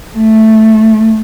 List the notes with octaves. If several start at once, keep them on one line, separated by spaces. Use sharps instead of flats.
A3